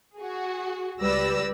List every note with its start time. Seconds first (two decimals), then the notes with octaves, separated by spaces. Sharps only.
0.18 F#4 G#4
1.00 C#2 G3 B4 D5 E6 A#6